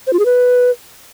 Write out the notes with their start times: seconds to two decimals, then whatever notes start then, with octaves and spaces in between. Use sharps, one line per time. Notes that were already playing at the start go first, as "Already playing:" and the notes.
0.07 C5
0.13 F4
0.19 G#4
0.25 B4